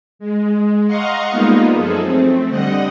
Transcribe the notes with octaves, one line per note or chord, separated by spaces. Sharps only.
G#3
D#5 F5 F#5 A#5 C6 C#6
G3 G#3 A#3 B3 D#4 F4
F#2 F3 G#4 A4
A3 C4
D3 G3 D#5 F#5